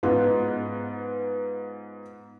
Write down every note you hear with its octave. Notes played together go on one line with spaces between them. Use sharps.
G#2 B3 D#4 F4